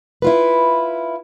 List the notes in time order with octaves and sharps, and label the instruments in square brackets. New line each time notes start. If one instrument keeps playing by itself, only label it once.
[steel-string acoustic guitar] E4 F4 B4